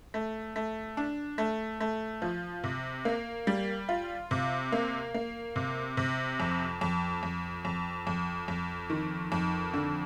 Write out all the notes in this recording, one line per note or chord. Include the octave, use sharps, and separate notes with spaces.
A3
A3
D4
A3
A3
F3
C3
A#3
G3
F4
C3
A#3
A#3
C3
C3
F2
F2
F2
F2
F2
F2
D#3
F2
D3